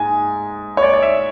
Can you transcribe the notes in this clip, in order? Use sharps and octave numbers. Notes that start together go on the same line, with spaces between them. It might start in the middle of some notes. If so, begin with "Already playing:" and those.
Already playing: G#2 G#5
C#5
D5
D5
E5